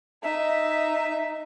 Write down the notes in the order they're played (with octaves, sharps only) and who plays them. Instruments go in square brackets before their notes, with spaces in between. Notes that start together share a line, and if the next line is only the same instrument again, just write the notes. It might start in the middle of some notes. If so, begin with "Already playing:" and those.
[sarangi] D#4 [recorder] E5